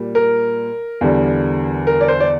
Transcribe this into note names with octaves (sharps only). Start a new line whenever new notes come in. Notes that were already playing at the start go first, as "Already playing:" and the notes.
Already playing: A#2 G3
A#4
E2 D3 G3
A#4
D5
C5
D5